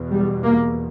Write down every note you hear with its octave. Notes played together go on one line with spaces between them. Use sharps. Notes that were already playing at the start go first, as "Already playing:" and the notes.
Already playing: E2 B2
G3
A#3